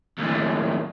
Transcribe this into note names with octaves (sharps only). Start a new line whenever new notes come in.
D#2 A2